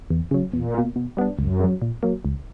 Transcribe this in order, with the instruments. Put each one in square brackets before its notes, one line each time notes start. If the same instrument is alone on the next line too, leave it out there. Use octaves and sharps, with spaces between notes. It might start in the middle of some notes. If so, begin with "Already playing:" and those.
[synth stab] E2
C#3 F#3
[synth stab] E2 [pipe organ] A#2
[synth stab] B2 A#3
B2
G3 B3 D4
[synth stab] C#2 [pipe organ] F#2
[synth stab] C#3 F#3
A#2
F#3 A#3
C#2